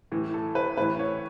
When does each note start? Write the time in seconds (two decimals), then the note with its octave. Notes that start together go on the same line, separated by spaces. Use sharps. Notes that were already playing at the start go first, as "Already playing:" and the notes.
0.12 A2 E3
0.34 A4
0.55 B4
0.77 A2 E3 B4
0.99 C#5